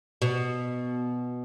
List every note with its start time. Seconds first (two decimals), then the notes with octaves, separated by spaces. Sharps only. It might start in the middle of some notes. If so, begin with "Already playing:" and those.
0.22 B2